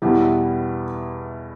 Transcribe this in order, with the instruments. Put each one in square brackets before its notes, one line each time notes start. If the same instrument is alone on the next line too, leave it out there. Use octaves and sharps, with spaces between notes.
[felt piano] E2 B2 G3 B3 E4